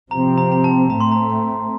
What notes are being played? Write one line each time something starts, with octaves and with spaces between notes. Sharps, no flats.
C3 F3 C4 A#5
A#5
A#5
A5
A2 A3 C4 A#5
C6
A#5
C6